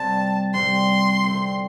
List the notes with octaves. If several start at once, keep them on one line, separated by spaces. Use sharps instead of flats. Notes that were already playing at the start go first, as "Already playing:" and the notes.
Already playing: C3 G3 C4 A5
C3 G3 C4 C6
D3 C4 E4